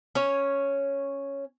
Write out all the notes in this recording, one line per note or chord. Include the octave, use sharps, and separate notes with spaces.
C#4 C#5